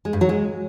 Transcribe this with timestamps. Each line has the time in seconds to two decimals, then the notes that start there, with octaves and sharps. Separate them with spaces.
0.05 G#3
0.13 G2
0.21 F#3
0.29 G#3